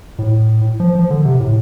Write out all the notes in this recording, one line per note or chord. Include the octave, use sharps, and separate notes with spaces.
A2
F3
F3
D3
C3
A2